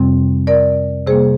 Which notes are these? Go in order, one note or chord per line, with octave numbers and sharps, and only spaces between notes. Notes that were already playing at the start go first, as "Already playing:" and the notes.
Already playing: F2 C3 G3 C4
A#4 D5
C3 G3 A#3 G#4 C5